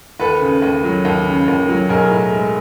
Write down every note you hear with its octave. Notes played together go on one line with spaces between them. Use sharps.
D#2 A4 B4
C#3
D#2
F#3
D#2
C#3
D#2
F#3
B1 G#4 A#4
A2
G#3